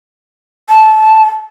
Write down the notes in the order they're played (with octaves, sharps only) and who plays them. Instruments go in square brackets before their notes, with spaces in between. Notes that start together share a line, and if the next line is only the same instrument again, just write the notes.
[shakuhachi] A5